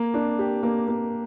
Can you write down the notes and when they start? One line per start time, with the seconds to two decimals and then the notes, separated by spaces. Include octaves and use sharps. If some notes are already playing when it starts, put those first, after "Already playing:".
Already playing: A#3
0.14 D4
0.39 G4
0.63 A#3
0.88 A#3